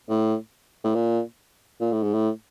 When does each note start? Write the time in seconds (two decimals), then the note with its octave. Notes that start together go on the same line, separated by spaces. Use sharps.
0.09 A2
0.84 A2
0.95 A#2
1.81 A#2
1.92 A2
2.03 G#2
2.14 A2